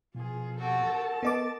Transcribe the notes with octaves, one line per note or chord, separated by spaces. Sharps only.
B2 F3 F4 G#4
C4 F#4 G4 A4 A5
A#4
B3 D#5 D6 A6